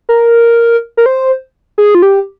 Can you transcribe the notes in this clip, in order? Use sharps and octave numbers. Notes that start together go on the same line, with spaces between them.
A#4
A#4
C5
G#4
F4
G4